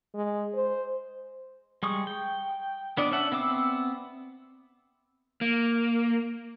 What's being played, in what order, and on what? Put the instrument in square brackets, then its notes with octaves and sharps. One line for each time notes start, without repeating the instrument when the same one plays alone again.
[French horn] G#3
C5
[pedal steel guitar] G3 G#3 C#6 D#6
G5
B3 D4 D5 D#5
C#4 D4 E5 F#5
B3 C4 E5 D6 E6
[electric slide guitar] A#3